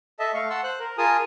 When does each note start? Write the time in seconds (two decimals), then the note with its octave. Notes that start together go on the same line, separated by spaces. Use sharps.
0.20 A4 D#5 E5 A5
0.34 A3 F5 C#6
0.50 F#5 A5 C6 E6
0.64 C5 F#6
0.79 A#4
0.98 F4 G#4 A#4 G#5 A5 D#6